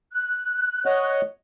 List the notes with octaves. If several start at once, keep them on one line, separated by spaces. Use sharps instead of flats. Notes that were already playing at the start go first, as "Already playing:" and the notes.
F#6
C#5 D#5 F#5